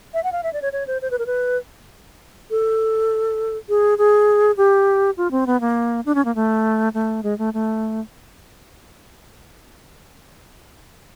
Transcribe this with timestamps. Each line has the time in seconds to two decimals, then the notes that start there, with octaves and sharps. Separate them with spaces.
0.14 E5
0.24 F#5
0.32 F5
0.43 E5
0.53 D5
0.62 C#5
0.73 C#5
0.87 C5
1.02 C5
1.11 B4
1.19 A#4
1.27 B4
2.51 A4
3.69 G#4
3.98 G#4
4.57 G4
5.17 F4
5.31 C4
5.47 B3
5.61 A#3
6.06 D4
6.15 C#4
6.25 A#3
6.35 A3
6.94 A3
7.23 G#3
7.38 A3
7.54 A3